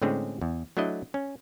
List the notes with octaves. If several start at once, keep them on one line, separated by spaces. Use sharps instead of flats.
A2 D3 G#3 C4 C#4 G#4
E2
F#3 A3 D4 E4 D#5
C#4